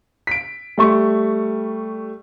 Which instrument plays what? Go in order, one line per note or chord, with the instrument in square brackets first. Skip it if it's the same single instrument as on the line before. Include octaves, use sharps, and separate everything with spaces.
[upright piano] B6 D7
G3 A3 C#6